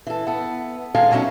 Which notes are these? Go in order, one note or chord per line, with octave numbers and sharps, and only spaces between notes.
E3 A4
B3 A4
D#3 G#3 A4 D#5 F5 G#5
B2 F#3 G3 A3 C#4 D#4